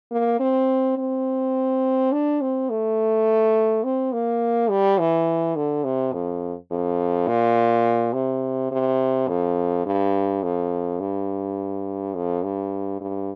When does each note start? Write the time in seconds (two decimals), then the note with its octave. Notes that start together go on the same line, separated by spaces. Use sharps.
0.11 A#3
0.40 C4
0.98 C4
2.12 D4
2.41 C4
2.70 A3
3.84 C4
4.12 A#3
4.70 G3
4.99 E3
5.56 D3
5.84 C3
6.13 F2
6.71 F2
7.28 A#2
8.13 C3
8.71 C3
9.28 F2
9.86 G2
10.43 F2
11.00 G2
12.15 F2
12.43 G2
13.01 G2